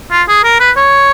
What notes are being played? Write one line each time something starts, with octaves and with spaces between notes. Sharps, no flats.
F4
G#4
A#4
B4
C#5